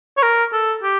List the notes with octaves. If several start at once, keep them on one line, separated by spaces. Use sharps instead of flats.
C#5
A#4
A4
G4